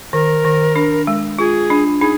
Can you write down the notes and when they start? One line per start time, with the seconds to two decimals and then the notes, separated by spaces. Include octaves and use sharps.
0.13 D#3 A#4
0.45 D#3
0.76 D4
1.07 G#3
1.39 F4 G#4
1.70 D4
2.01 D#4 G#4